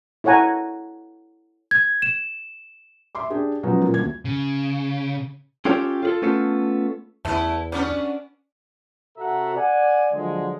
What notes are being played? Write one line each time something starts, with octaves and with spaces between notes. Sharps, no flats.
E4 A4 C#5 F#5 G#5 A#5
G#6
E7
E5 C6 D6
D4 G4 G#4
F3 F#3 G#3 B3 C#4 D#4
A#2
D#1 D2 G#6
C#3
C#4 F4 G4 A4 C#5
F4 G#4 A4
A3 B3 C#4 F4 A4
E2 A3 B3 E4 B4 E5
F#3 G3 B3 C#4 D4
C3 F#4 A4 E5 F#5 A#5
D5 F#5 G#5
D3 F3 F#3 G#3